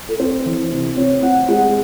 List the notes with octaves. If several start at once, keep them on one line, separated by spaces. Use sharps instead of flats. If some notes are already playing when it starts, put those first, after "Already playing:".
A4
C4 C5
E3
C3
C4 C#5
C4 F#5
G#3 F#5